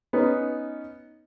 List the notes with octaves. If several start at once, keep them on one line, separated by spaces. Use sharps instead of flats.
B3 C#4 D#4